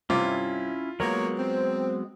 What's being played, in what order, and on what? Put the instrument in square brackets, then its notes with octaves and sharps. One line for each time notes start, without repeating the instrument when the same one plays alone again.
[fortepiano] G2 C3 D6 [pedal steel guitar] C#4 E4 [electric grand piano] F4
[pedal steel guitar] F#3 G#3 B3 [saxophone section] A#3 C#5 [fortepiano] A#4
[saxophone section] C4